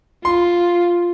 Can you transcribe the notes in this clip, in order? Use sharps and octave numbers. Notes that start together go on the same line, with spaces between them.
F4 C6